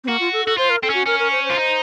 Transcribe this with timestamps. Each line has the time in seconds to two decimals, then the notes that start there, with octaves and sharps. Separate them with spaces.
0.04 C4
0.08 A#3 F#4
0.20 F4
0.33 A4
0.45 F#4 A4
0.57 F4 C5
0.70 A#4
0.82 C4 A4
0.90 C#4 F#4
1.06 C#4 A#4
1.19 A#4
1.32 C5
1.44 C5
1.50 F4
1.56 D#4